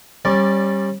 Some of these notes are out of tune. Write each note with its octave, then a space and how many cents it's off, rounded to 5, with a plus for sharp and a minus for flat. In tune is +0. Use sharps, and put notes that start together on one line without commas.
G3 +0 C#4 -35 D5 -5